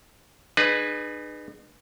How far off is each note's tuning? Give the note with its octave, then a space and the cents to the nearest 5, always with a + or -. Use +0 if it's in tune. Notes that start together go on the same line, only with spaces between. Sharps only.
D#4 -45 G#4 +0 B4 -5